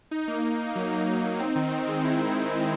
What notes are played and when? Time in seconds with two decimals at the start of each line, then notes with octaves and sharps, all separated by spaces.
0.11 D#4
0.28 A#3
0.44 D#4
0.60 D#4
0.76 F#3
0.91 F#3
1.08 D#4
1.24 D#4
1.39 C4
1.56 D#3
1.72 C4
1.88 G#3
2.04 E4
2.20 E4
2.36 D#3
2.52 E4